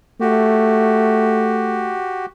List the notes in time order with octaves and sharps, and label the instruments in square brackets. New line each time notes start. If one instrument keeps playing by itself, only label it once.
[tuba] A3 [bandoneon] F#4 G4